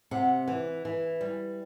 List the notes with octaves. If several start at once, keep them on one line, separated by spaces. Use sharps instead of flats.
C3 F#5
E3
E3
G3